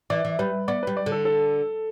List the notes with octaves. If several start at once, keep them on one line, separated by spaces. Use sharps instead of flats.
E3 D5
E3
G3 B4
B3 D5
G3 B4
D5
D3
A4
A4